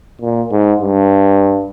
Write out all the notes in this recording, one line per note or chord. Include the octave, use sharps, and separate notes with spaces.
A#2
G#2
G2